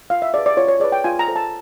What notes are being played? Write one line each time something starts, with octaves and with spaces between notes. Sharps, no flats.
F4 F5
E5
G#4 B4 D5
D5
F4 C#5
C#5
G#4 B4 D5
G5
F4 G#5
A#5
A4 C5
A5